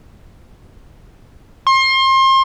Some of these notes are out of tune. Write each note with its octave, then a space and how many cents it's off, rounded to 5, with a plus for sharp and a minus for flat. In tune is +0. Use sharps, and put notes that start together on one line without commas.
C6 +30